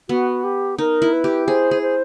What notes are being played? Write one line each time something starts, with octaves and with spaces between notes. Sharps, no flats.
B3 F#4
G4
D#4 A#4
E4
B4
G4
G#4 C5
G#4
C5